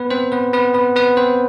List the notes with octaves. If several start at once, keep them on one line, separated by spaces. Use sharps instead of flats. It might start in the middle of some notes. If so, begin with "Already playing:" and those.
Already playing: B3 B4
C4 C5
B3 B4
B3 B4
B3 B4
B3 B4
C4 C5